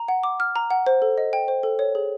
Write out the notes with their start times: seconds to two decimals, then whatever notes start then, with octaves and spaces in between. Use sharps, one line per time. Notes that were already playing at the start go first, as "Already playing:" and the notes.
Already playing: A#5
0.08 F#5
0.23 D6
0.40 F6
0.56 A#5
0.70 F#5
0.87 C5
1.02 A4
1.18 D#5
1.33 G5
1.48 C5
1.63 A4
1.79 C#5
1.95 G#4